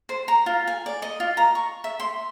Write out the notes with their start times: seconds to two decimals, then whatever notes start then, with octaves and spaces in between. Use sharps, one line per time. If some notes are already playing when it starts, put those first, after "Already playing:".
0.09 C5
0.28 A#5
0.46 F4
0.67 G#5
0.86 D5
1.02 D#5
1.20 F4
1.37 A#5
1.55 C#6
1.84 E5
2.00 C6